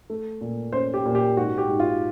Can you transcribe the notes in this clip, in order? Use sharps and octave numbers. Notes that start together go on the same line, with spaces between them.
A3
A#2
C#4 C5
G4
A#2
G4
G#2 F#4
G4
G#2
F4